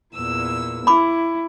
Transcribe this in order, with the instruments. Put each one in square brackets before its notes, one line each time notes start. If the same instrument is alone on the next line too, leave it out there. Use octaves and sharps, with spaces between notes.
[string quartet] E2 A#2 E6
[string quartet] E4 [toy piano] B5 D6